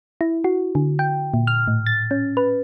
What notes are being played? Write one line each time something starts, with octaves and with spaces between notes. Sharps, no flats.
E4
F#4
D3
G5
A#2
F6
A2
A6
C#4
B4